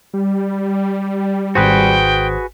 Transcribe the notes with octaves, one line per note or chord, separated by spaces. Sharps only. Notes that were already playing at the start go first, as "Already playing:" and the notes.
G3
G#1 F#4 G#4 B4 C5 G5